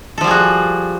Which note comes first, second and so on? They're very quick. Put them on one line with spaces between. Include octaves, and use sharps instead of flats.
A4 F3 G3 G#4 F#4